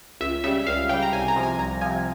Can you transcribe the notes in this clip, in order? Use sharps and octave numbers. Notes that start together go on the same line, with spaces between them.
C#2 E5
C#3 G3 E5
C#2 F5
C#3 G3 G5
A#5
C2 G#5
A#5
C3 F3
G#5
C2 A#5
C3 F3 G#5